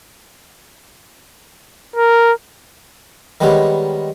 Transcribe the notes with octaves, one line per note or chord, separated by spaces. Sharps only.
A#4
D#3 G3 G#3 B3 C#4